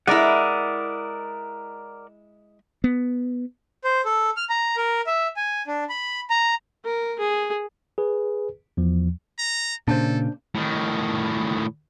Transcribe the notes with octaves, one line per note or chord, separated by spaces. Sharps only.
G#3 E4 A#4 D5 F#5
B3
C5
A4
F6
A#5
A#4
E5
G#5
D4
B5
A#5
A#4
G#4
G#4 B4
E2 F3
A#5
A#2 C#3 D4 A4 C5
A2 D#3